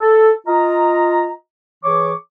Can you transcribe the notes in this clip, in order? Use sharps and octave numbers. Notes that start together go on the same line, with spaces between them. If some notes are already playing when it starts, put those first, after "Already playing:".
A4
F4 D#5 A#5
E3 G#4 C#5 C#6 D6